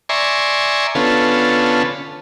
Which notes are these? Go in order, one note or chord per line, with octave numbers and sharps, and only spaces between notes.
D5 E5 G#5 A#5 C6 C#6
D3 B3 C#4 F4 A4